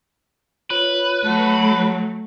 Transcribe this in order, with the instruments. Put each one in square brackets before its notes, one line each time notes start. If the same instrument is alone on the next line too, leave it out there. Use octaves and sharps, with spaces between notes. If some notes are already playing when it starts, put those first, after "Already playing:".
[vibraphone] F4 C#5 [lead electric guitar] B4
[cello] F#3 A3 [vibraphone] C#5 F#5 A5